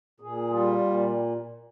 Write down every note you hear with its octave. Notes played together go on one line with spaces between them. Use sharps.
A#2 G#4
G3 F4
A#2